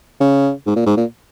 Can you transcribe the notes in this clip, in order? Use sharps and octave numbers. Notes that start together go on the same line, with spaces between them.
C#3
G#2
A#2
G#2
A#2